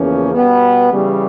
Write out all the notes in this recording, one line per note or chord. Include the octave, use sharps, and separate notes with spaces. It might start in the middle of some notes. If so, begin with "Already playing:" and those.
Already playing: E2 C#3 F3 A#3 C#4
B2 G3 B3
C#3 E3 G3